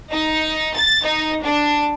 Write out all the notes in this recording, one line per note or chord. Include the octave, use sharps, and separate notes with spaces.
D#4
A6
D#4
D4